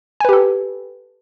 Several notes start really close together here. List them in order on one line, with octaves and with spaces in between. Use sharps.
G#5 B4 G4 A4